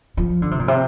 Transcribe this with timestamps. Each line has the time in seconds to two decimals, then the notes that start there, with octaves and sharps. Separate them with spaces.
0.17 F3
0.42 D3
0.51 C3
0.59 A#2
0.68 C3